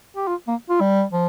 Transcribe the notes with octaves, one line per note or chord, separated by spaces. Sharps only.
G4
F4
A#3
F4
G3
F3